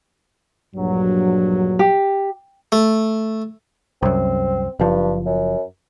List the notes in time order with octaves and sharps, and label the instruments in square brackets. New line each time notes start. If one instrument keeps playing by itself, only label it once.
[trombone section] A#1 G2 F#3
[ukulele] G4
[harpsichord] A3
[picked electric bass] C2 F#2 [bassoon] C4
[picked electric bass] F#1 F3 [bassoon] G2
[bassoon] F#2